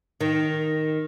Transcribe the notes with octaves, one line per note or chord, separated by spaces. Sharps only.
D#3